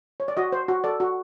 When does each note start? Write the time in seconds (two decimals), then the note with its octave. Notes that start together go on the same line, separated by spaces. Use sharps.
0.20 C#5
0.28 D5
0.37 F#4 D#5
0.52 C5
0.68 F#4
0.84 A4 D5
1.00 F#4